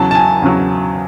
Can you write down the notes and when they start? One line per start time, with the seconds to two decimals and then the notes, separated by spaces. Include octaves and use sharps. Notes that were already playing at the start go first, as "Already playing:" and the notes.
Already playing: E2 C#3 F#3 A5
0.11 A5
0.15 G#5
0.42 E2 C#3 F#3